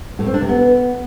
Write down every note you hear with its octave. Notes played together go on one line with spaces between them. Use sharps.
A2
C4
D4
C3
B3